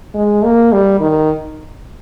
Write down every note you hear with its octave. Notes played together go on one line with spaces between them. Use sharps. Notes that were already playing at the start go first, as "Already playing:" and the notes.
G#3
A#3
G3
D#3